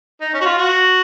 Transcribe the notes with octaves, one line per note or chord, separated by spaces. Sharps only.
D#4
C#4
F#4
F4
F#4